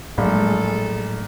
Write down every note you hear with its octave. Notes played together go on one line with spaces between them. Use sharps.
A#1 A2 F#3 G#3 A4